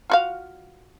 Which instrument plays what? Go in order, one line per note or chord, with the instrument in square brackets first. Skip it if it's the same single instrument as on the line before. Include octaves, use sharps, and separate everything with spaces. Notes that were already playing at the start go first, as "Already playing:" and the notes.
[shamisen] F4 F#4 F5